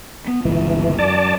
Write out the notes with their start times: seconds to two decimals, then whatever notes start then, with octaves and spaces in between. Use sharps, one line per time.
0.27 B3
0.45 G1 C#2 A#2 E3
0.99 F#2 D5 A5